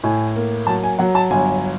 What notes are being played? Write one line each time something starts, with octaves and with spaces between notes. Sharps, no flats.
A2 G#5
A#3
F#3 A5
G#5
F#3 F#5
A5
G1 G#5